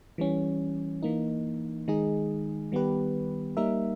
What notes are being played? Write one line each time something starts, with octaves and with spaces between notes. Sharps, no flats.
E3 G3 C#4
E3 A#3 D#4
D#3 G#3 D#4 G#4
D#3 G3 B3 G4 B4
G3 A#3 D#4 A#4 E5